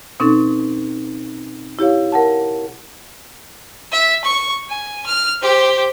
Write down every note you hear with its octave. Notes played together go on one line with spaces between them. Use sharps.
B2 C4 C#4 D#4 A4
E4 G4 C#5 F5
A#4 F#5 A5
E5
C#6
G#5
F6
G4 C5